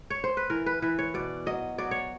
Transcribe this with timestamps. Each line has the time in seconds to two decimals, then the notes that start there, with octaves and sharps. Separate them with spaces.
0.10 C#5
0.24 C5
0.37 B4
0.50 E3 A#4
0.66 B4
0.82 E3 B4
0.99 C#5
1.14 B2 D5
1.46 F#3 D#5
1.78 F#3 D5
1.91 C#5